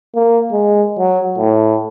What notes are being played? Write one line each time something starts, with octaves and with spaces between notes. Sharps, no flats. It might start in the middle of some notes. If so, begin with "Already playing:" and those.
A#3
G#3
F#3
A2